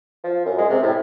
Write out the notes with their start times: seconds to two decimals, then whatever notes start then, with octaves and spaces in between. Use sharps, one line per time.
0.24 F3
0.45 F#2
0.58 G#3
0.70 C3
0.83 A2